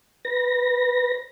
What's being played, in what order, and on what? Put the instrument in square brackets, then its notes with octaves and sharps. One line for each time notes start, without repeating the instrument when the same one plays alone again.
[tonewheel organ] B4 A#6